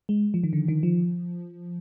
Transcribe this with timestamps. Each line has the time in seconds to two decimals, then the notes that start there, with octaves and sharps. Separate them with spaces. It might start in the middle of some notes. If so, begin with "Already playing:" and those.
0.09 G#3
0.34 F3
0.44 D#3
0.53 D3
0.68 D#3
0.83 F3